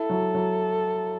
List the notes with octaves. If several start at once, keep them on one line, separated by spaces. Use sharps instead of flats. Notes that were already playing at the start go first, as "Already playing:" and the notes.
Already playing: E4 A4
F#3
F#3